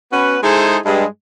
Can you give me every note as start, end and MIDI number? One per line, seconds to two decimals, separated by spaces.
0.13 0.39 59
0.13 0.39 61
0.13 0.39 66
0.13 0.39 71
0.43 0.78 56
0.43 0.78 63
0.43 0.78 64
0.43 0.78 68
0.43 0.78 69
0.43 0.78 72
0.86 1.06 43
0.86 1.06 56